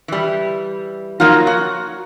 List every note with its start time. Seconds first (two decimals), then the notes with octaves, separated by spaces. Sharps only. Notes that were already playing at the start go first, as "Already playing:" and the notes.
0.08 E3 G3
1.20 F3 F#3 A#3 D#4 F4
1.47 F#4